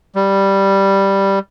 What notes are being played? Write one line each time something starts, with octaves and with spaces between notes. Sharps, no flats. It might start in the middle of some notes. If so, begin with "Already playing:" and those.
G3